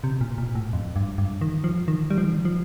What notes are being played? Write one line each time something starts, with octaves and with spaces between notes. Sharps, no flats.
C3
A#2
A#2
A2
F2
G2
G2
D#3
F3
D#3
G3
F3
D#3
F3
F3